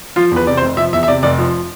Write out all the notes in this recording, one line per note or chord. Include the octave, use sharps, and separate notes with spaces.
F3 F4
E2 B4
C3 D5
C5
F1
F3 E5
E2 E5
E5
C3 D5
F1 D5
F3